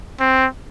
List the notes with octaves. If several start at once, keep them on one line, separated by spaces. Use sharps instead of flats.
C4